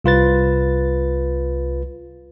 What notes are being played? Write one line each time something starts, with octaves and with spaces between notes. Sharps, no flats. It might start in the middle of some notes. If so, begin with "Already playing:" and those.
C2 F4 B4 A6